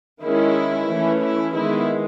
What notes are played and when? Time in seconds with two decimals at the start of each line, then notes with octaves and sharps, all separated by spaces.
0.22 D#3 G#3 C#4 E4
0.88 E3 A3 C#4
1.20 E4
1.52 D#3 G#3 B3 E4